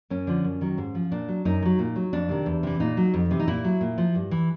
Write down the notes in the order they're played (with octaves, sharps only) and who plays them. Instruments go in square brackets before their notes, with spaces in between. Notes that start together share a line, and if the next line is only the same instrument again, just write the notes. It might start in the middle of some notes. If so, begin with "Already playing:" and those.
[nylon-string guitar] F#2 C#4
D3 F3
F#2
D#3 F#3
G#2
F3
A#2 D4
F#3
F#2 D#4
D#3
F#3
A#2
F#3
F2 D4
C3 D#3
E2
C3 E3
A#2 D#4
F#3
F2
C3 E3
D#4
A#2 E4
F#3
A#2
F3
G2
E3